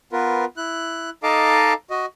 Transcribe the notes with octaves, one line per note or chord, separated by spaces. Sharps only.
B3 F4 A#4 B4
E4 F#6
D#4 A4 D#5 F5 A5 D6
F#4 D#5